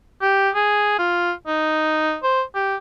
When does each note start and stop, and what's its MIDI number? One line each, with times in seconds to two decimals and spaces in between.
0.22 0.50 67
0.55 0.98 68
0.99 1.32 65
1.47 2.17 63
2.23 2.42 72
2.55 2.76 67